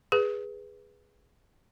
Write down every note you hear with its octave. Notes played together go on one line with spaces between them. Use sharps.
G#4 B4